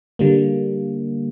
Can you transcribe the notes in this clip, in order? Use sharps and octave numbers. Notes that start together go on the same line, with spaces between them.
D3 G3 A#3